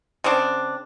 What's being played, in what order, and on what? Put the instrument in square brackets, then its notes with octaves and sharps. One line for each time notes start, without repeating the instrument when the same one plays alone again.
[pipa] C#3 C4 D4